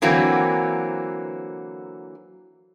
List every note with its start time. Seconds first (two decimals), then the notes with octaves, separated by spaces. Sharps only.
0.02 D3 E3 F#3 A#3 C4